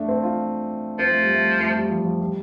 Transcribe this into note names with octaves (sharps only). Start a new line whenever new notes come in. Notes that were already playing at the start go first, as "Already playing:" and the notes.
Already playing: A3 D4
C4
F4
F3 C4
A3
G3
A3
A3
G3
F3
F3
G3